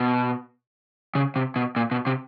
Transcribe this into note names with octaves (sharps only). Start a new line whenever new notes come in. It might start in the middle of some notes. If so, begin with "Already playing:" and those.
Already playing: B2
C#3
C3
B2
A#2
B2
C3